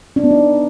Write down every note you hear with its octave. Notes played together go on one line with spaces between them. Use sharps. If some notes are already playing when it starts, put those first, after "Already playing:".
D4
B3
D#4